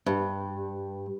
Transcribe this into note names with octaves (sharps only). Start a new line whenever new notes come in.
G2